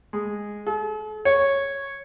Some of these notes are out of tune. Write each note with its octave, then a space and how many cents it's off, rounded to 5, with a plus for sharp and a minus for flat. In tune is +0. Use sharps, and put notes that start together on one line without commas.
G#3 -5
A4 -45
C#5 -5